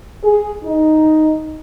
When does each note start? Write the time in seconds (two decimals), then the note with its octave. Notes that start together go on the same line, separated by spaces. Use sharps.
0.24 G#4
0.64 D#4